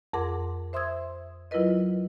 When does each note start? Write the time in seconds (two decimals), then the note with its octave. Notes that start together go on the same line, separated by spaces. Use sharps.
0.13 F2 G#4 A#4 F#5 C6 D6
0.73 C5 E5 C6 D#6 E6 G#6
1.51 F#3 E4 F4 A#4 B4 D#5